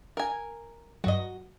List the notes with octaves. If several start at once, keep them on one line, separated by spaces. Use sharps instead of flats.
A#4 G#5
G2 F#3 F#4 D#5